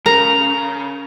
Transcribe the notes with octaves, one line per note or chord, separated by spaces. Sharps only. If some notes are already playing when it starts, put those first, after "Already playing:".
C#3 A#4 A#5